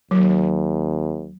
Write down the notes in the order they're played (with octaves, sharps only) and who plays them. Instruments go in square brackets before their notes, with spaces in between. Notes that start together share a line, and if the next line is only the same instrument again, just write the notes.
[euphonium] D#2 [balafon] F#3